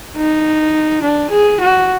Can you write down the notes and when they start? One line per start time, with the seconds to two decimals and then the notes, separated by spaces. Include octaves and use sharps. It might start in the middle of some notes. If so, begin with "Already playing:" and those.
0.16 D#4
1.03 D4
1.31 G#4
1.60 F#4